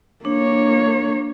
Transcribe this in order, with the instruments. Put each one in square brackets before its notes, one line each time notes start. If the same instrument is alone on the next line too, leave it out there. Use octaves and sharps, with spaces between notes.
[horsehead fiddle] A#3 C#5 [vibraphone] D4